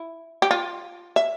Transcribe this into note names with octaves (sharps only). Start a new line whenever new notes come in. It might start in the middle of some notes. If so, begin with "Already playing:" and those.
Already playing: E4
G4
F4
E5